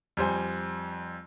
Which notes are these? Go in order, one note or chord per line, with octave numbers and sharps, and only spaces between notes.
F2 G3 C5 G#5